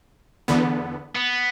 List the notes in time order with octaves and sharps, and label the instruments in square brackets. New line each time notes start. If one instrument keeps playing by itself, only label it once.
[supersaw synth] E2 D3 B3
[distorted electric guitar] B3